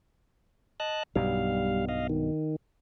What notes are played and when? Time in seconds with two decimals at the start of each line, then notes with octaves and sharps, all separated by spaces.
0.80 D#5 A5 F#6
1.16 B1 G2 B2 G3 F5
1.89 D#5 F5
2.09 D#3